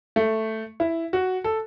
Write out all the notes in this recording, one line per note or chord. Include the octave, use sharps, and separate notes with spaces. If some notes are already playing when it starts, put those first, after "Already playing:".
A3
E4
F#4
A4